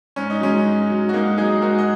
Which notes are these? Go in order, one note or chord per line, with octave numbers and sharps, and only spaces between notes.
G#2 C#4
D#4
F#3 G#3 C#4
G#2
F#3
F#4
G#2 A#3 D#4
F#3 D#4 G#4
G#2 F#4 A#4
D#5